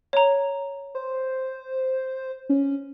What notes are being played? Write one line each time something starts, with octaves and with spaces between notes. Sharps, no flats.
C#5 A#5
C5
C#4